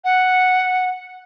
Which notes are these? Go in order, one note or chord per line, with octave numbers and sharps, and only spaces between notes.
F#5